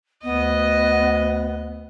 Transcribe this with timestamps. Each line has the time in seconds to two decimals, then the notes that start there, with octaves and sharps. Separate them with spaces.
0.24 D2 B3 D#5